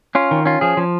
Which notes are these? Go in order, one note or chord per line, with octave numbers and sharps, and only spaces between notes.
C#4 F4
D#3
C#4 F4
F3 G#4
F3